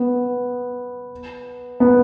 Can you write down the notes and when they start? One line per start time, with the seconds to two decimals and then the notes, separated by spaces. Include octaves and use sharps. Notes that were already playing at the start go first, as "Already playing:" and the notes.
Already playing: B3
1.80 B3